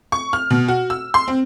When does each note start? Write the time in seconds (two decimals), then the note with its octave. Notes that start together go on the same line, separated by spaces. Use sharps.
0.12 C#6
0.33 F6
0.51 B2
0.68 F#4
0.90 E6
1.14 C6
1.28 C4